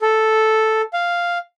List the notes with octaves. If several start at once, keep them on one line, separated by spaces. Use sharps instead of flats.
A4
F5